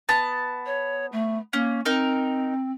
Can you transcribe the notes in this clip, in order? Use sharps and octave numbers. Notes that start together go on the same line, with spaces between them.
B3 A5
C#5
A3
A#3 C#4
C4 D#4 A#4